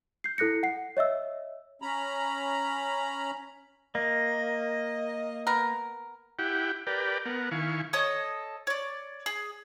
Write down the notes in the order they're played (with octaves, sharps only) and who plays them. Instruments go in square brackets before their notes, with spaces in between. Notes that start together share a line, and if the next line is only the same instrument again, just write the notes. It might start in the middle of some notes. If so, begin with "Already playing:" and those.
[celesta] G6 C7
E4 A4 F#6 A#6 C#7
F#5 C7
C#5 D#5 E5 E6
[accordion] C#4 A#5 B5
[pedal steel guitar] A#3 [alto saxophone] D#5
[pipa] B3 A#4
[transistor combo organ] E4 G4 F#5 G5
G4 A#4 B4 D5 G5
B3 A#4 F#5
D#3 E4 F5 G#5 C#6
[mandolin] A4 C#5 D#5 D#6
C#5 D5
G#4